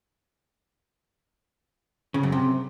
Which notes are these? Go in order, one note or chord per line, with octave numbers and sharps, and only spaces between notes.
C#3
F#2
C3